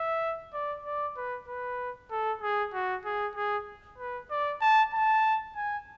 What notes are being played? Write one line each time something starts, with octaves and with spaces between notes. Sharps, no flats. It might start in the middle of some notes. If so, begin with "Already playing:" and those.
Already playing: E5
D5
D5
B4
B4
A4
G#4
F#4
G#4
G#4
B4
D5
A5
A5
G#5